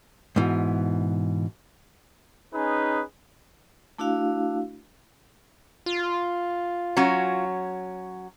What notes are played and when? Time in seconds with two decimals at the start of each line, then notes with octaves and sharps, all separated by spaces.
0.36 G#2 B2 E3
2.53 C#4 D#4 G#4 B4
3.98 A3 D4 E4 F#4 F5
5.86 F4
6.97 F#3 C#4 F#4